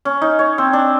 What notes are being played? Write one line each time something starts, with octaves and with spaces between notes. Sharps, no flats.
C#4
D#4
C#5
C4
D4